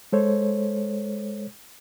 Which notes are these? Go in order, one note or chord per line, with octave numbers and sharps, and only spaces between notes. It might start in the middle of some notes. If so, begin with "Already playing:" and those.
G#3 A4 C5 C#5